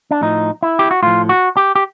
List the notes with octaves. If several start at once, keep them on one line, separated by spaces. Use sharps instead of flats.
D4
A2 F3 D#4
E4
G4
F#4
A2 F3 F4
F#4
G4
G4